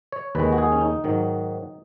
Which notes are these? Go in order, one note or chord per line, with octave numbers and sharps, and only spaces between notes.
C#5
D#2 D#3 G#3 B4
F#4
G#4
C#4
D#4
G#2 D#3 F#3